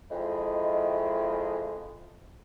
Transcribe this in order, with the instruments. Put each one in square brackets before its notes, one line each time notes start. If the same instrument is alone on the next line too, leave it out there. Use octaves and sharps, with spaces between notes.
[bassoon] F2 [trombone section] D#3 G#3 E4